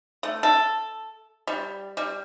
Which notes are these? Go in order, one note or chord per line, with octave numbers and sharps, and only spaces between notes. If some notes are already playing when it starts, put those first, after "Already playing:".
A3
A4
G3
G3